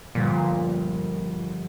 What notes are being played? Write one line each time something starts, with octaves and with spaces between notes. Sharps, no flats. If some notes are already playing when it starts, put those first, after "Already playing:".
G1 A#2 F3 A#6